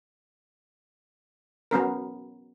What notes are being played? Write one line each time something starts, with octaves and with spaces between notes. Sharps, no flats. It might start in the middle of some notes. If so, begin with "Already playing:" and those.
F#3 B3 C#4 A#4